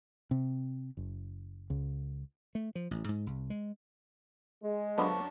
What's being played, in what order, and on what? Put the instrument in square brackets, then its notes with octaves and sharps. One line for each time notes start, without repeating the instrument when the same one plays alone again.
[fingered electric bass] C3
F#1
C#2
[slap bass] A3
F3
A1
G#2
C2
G#3
[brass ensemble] G#3
[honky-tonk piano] F#2 F#3 D4 [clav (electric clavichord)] D3 F3 B3 [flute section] A5 C#6